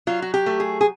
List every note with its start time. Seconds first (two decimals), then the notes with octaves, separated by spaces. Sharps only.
0.07 F#3 F4
0.22 F#4
0.34 G4
0.46 A3
0.60 G#4
0.81 G#4